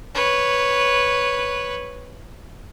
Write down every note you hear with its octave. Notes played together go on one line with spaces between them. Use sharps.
B4 C#5